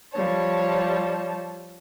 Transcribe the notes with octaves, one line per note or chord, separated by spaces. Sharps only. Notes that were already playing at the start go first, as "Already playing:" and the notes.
F3 G3 C#5 A5